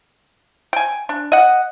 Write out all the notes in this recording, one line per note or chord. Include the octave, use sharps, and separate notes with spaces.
G5 G#5
D4
D#5 F#5